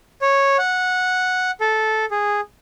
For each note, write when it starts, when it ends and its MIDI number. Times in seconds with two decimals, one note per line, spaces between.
0.22 0.57 73
0.58 1.51 78
1.61 2.05 69
2.11 2.40 68